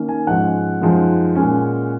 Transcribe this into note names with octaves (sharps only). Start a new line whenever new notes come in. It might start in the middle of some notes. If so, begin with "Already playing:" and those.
Already playing: D#3 A#3 C#4
G#5
G#2 F3 G#3 C#4 F#5
F#2 F3 G#3 D#4
A#2 G#3 C#4